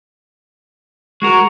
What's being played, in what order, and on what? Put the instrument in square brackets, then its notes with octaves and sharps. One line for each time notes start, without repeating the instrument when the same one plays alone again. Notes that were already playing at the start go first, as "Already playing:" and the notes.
[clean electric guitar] G#3 F#4 A#4 [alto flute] C#6